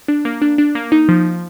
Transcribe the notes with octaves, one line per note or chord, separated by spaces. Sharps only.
D4
A#3
D4
D4
A#3
D#4
F3